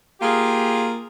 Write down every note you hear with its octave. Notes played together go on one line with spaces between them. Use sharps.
A#3 F4 G4 G#4